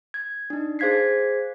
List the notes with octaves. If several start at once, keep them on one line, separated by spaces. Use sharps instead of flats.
G#6
D4 D#4
G#4 C5 F5 G#6 B6 C7